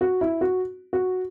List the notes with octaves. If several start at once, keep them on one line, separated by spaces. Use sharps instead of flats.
F#4
E4
F#4
F#4